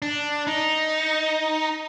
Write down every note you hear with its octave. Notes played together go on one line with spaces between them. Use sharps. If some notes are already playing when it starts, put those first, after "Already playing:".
D4
D#4